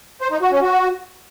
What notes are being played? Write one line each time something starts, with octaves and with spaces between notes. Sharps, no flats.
C5
D#4
F#4
C#4
F#4